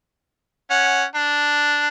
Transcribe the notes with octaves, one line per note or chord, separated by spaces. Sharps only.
C#4 F#5
D4